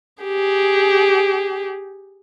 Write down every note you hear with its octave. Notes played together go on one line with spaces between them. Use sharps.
G4 G#4